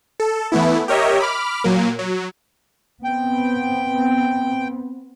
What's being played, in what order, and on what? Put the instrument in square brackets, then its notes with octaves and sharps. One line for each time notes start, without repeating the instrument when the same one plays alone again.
[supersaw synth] A4
E3 A3 B3 E4
G4 A#4 C#5 D#5 E5
B5 D6 F6
A#2 F#3 A#3
F#3
[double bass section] B3 C4 [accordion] G5